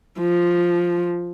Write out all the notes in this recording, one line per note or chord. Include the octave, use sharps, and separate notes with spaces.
F3